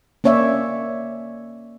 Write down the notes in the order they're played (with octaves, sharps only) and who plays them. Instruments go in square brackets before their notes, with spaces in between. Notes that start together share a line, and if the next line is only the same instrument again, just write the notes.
[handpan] A#3 C#4 C#5 D5 E5